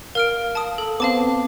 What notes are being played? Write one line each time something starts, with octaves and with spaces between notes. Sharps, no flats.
A#4 F5 F6 D7
A5 D#6
A4
B3 C4 F5 A5 D6